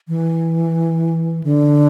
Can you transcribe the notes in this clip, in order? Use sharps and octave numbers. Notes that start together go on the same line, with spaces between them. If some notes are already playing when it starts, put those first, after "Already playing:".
E3
D3